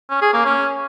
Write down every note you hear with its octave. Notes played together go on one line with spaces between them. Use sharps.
C#4
G#4
A#3
C#4